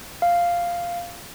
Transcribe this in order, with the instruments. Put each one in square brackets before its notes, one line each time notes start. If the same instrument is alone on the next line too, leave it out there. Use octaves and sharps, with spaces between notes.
[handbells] F5